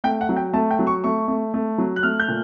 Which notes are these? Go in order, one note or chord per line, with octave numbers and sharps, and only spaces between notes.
A3 G5
F#5
F#3
G5
A3 A5
G5
F#3
C#6
A3 C#6
A3
A3
F#3
F#6
A3 F6
G6
A#2